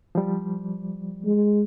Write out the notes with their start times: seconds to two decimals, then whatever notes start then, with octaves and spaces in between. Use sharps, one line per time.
0.15 F3 G3
1.25 G#3